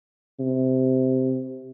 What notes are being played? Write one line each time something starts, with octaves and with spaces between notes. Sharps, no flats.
C3